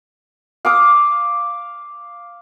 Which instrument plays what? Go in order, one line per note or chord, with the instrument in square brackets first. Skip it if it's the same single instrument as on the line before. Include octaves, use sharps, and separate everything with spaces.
[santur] F5 D6 D#6